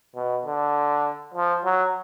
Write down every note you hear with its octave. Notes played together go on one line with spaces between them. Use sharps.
B2
D3
F3
F#3